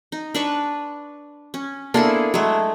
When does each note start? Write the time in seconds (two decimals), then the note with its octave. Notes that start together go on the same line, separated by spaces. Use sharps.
0.12 D#4
0.34 D4 B4 C#6
1.54 C#4
1.94 A#3 D4 E4 G#4 A4 C6
2.34 F#3 G#3 A3